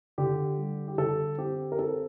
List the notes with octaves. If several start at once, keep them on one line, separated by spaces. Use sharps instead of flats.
D3 G4
G3
G4
D3 A4
C4 G4
A#4
C4 A4